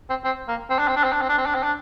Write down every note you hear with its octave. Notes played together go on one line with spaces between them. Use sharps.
C4
C4
A#3
C4
D4
C4
D4
C4
D4
C4
D4
C4
D4
C4
D4